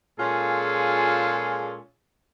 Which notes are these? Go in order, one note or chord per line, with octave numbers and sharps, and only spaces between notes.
A#2 G#3 C#4 F4 G#4 A4